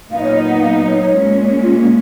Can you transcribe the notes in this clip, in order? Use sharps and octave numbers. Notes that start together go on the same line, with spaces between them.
A#2 F#3 B3 D#4 F5
D#5
C#5
D#5
F#5
F5
D#5
C#5
C#5
A#2 G#3 C#4
F4
A#3